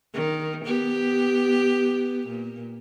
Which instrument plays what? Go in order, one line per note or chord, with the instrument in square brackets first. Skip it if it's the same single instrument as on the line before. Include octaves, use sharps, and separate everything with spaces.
[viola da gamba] D#3
B3 G4
A#2